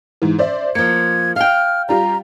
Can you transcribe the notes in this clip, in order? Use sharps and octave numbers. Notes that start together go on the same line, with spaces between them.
G#2 E3
C5 D5 E5
F3 A#3 G#6 C#7
F5 G5 F6
G3 F4 G4 A#5